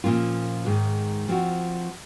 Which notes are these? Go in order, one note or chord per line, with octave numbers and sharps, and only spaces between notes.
A#2 F3 A#3 C#4 F4
G#2 D#3 G#3
F3 C4 F#4